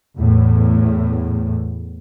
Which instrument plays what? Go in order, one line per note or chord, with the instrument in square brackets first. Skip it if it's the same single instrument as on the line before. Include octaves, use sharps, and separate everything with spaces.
[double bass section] E2 A2